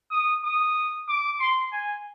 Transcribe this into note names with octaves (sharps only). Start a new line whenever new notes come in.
D#6
D#6
D6
C6
G#5